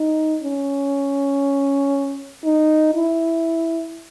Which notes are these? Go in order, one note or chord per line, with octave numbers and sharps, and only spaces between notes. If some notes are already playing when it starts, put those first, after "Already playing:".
Already playing: D#4
C#4
D#4
E4